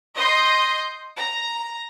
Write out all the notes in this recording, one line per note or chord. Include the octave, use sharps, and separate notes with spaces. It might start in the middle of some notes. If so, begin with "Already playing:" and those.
D#5 C6 G6
A#5